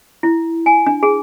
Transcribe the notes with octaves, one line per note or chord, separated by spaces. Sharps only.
E4
G#5
D4
G#4